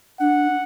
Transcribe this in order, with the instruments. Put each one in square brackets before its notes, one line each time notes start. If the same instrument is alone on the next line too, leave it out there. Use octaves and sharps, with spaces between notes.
[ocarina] D4 [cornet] F#5